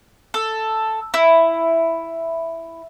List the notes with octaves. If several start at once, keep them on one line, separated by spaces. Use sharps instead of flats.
A4
E4